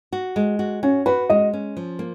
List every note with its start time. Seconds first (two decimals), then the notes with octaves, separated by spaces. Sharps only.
0.12 F#4
0.36 G#3
0.59 F#4
0.83 C#4 F#4
1.06 F#4 B4
1.30 G#3 D#5
1.53 C#4
1.77 F3
1.99 A#3